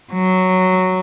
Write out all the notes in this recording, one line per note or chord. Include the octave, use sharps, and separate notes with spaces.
F#3